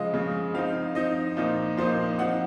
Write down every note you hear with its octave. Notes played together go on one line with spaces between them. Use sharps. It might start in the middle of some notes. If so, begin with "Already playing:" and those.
Already playing: C#3 F3 G#3 D#5
C#3 F3 G#3
F3 C4 D#4 F5
F3 C4 D#4 D#5
A#2 F3 A#3 D#4
A#2 F3 A#3 D#4 C5
F3 C4 D#4 F#5